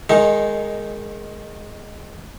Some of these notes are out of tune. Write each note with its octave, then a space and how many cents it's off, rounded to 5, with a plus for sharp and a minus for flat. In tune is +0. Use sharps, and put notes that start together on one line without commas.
D#3 -15 G#3 +0 D#4 +0